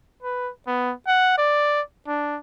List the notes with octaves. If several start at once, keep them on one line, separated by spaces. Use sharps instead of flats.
B4
B3
F#5
D5
D4